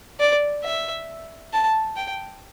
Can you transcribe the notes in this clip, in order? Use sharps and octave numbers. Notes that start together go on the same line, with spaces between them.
D5
E5
A5
G5